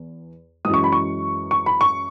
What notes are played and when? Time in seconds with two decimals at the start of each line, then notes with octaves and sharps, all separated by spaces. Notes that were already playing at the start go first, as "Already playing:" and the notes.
Already playing: E2
0.65 F#2 E3 G#3 D#6
0.74 C#6
0.84 B5
0.92 C#6
1.51 C#6
1.66 B5
1.81 C#6